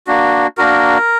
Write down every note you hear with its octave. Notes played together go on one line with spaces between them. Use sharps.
A#3 D4 F#4
A#3 D4 F#4 A#4